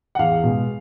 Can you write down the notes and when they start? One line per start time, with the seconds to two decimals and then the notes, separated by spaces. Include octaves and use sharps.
0.15 F#5
0.19 E2 F5
0.43 B2 G#3